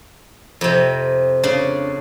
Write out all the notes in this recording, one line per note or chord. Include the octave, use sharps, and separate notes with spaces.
F2 C3
C#3 D4